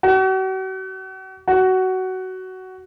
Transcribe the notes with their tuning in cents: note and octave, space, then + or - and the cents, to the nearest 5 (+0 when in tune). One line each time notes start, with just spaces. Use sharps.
F#4 +40
F#4 +15